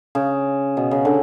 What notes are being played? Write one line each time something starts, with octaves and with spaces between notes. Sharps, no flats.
C#3
B2
C#3
D3